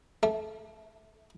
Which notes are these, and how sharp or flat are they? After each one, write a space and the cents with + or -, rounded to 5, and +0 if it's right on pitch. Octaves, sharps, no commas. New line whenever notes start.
A3 -20